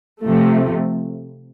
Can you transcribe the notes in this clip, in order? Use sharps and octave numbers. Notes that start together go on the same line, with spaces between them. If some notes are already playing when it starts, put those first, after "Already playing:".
C3 F3 A3